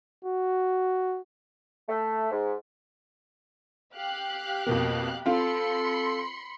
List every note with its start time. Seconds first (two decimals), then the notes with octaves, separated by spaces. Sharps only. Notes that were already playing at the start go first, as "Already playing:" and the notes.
0.25 F#4
1.88 A3
2.31 G#2
3.95 G4 F5 F#6
4.67 F2 B2 A#3
5.26 C4 F4 A4 F5 B5 C6 C#7